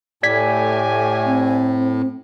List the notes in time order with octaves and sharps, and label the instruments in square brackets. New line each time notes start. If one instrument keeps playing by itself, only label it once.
[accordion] A2 [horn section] A3 G4 G#5 [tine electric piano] D5 G#6 B6
[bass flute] C4